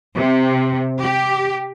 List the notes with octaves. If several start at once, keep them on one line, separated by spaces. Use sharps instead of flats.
C3
G4